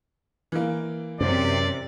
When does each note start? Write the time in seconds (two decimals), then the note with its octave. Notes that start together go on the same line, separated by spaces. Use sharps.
0.52 E3 A#3
1.21 F#2 C3 D5